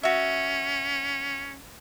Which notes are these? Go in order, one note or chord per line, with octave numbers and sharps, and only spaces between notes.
C#4 F#4 E5